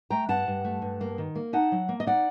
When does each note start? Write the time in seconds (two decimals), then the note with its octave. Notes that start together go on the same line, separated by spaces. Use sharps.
0.10 A3 G5 A#5
0.29 G2 F#5 A5
0.47 G2
0.65 A3
0.82 G2
1.01 A#3
1.18 D#3
1.35 A#3
1.53 D#4 F#5 A5
1.72 F#3
1.89 A#3
2.00 D#5
2.06 D#4 D5 F#5